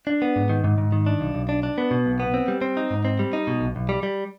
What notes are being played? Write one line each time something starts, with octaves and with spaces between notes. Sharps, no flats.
D4
B3
G#2
D#3
G#2
G#2
D#3
D4
B1
B1
D4
D4
B3
B2
B1
B3
C4
G3
C4
D#4
G#2
C4
G3
D#4
B2
B1
B1
G3
G3